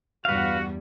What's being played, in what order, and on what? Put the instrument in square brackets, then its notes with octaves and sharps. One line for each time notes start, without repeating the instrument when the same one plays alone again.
[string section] E2 G2 G3 [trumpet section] F#4 [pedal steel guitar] B4 F5